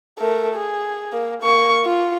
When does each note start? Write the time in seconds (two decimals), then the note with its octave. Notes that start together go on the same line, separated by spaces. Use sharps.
0.19 A3 A#4
0.54 G#4
1.12 A#3
1.42 A#3 C#6
1.85 F4